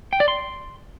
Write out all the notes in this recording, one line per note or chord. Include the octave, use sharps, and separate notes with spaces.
G5
D5
C6